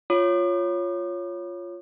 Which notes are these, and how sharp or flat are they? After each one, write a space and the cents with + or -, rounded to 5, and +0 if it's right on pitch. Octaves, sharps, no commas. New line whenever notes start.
F4 +0 C#5 +0 D6 +45